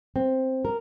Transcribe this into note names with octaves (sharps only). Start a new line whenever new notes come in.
C4
A#4